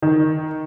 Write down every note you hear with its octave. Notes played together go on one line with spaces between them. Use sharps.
D#3